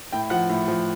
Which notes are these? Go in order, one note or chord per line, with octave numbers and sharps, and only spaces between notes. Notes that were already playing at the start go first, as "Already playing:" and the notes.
A2 G5
F3 F#5
A2
F3